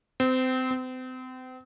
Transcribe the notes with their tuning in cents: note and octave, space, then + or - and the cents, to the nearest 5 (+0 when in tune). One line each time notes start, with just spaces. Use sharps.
C4 -25
C4 -35